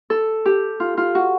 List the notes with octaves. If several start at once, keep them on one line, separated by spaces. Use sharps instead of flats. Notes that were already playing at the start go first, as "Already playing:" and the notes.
A4
G4
F4
F4
F#4